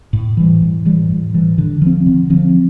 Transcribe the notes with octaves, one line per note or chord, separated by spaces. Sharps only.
A2
E3 G3
A2
E3 G3
A2
E3 G3
D3
F3 C4
D3
F3 C4